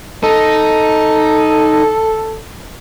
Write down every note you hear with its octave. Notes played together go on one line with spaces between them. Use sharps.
D#4 A4